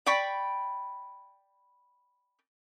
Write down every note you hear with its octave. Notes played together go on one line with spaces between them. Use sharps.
D5 G5 B5 C#6